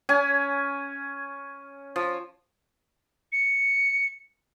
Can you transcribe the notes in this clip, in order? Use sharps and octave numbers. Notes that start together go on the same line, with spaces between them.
C#4 G#5
F3
C#7